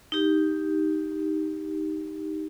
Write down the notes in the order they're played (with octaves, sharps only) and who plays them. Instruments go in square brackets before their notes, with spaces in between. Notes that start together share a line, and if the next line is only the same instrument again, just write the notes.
[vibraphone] D#4 G4